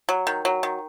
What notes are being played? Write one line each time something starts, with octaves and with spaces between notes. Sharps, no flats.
F#3
D#3
F#3
D#3